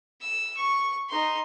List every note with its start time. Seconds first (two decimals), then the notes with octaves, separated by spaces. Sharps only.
0.21 E6
0.56 C#6
1.09 D#4 C6